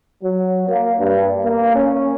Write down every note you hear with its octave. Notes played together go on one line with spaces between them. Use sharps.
F#3
A#3
G2
A#3
C#4